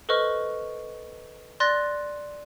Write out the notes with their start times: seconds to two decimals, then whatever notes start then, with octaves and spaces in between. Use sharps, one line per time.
0.09 A4 B4 C5 D#5 C#6 F6
1.60 D5 C6 F#6 A6 A#6